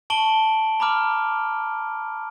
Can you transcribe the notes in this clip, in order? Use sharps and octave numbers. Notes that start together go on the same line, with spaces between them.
A5 C#6 D7 F#7 G7
A#5 B5 D6 F6